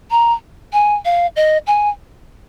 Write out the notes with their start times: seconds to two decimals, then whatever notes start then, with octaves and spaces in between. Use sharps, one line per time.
0.11 A#5
0.73 G#5
1.05 F5
1.36 D#5
1.67 G#5